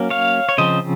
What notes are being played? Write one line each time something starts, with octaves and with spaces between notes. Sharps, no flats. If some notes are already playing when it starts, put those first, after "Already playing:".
Already playing: F#3 A#3 C#4
C#5 F5
C#5
C#3 F3 C4 C5 D#5